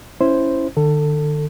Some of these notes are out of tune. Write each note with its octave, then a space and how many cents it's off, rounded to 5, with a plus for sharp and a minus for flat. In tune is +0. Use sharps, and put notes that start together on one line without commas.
C#4 -5 E4 +0 C5 +0
D3 +45 A4 +20